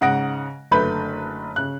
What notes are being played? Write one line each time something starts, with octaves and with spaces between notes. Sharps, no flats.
G#2 C#3 F#5 D#6 A#6 D7
F#1 D3 A3 B4 B5 G6
C#3 F#6